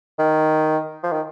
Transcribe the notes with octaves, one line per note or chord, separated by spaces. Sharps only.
D#3
F3
D#3